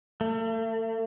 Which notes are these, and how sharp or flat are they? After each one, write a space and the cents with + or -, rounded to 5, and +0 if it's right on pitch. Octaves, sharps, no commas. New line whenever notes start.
A3 +40